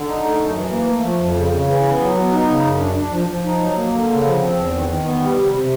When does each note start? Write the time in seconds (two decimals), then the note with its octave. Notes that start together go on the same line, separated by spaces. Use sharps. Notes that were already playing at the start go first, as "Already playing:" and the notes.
Already playing: D3
0.08 D#4
0.23 A3
0.40 F#2
0.56 E3
0.71 A#3
0.88 A3
1.04 F3
1.20 F2
1.36 C#3
1.52 C#3
1.68 E3
1.84 B3
2.00 F#3
2.17 B3
2.32 D#4
2.48 C#3
2.64 F#2
2.80 D4
2.96 D4
3.12 F3
3.28 F3
3.45 D#4
3.60 F#3
3.77 A#3
3.92 D3
4.09 C#3
4.25 F3
4.40 C4
4.56 E2
4.73 D#3
4.89 D#3
5.04 B3
5.21 G3
5.36 C3
5.53 C3